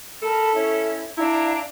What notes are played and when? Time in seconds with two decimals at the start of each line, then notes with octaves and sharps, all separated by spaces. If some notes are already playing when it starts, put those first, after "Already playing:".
0.22 A4 A#4 A5 B5
0.55 C#4 E4 C#5
1.17 D4 E4 F5 A#5